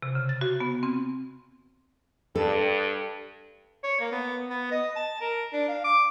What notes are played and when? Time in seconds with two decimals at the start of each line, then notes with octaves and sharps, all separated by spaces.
0.02 C3
0.15 C#3
0.29 A6
0.41 F#4
0.60 B3
0.83 C4
2.35 G2 A4
3.84 C#5
4.00 A#3
4.12 B3
4.49 B3
4.71 D#5
4.96 A5
5.21 A#4
5.53 D4
5.68 F5
5.84 D6